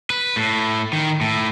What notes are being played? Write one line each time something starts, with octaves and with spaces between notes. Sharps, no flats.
B4
A2
D#3
A2